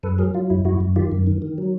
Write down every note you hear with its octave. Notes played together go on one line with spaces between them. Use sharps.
F#2 A4 B4
F#3 G#4 A#4
F#3 F4
F#2 E4
F#2 E4 F#4
F#2
D#3 F4 G4
F#2
D#3
D#3
F#3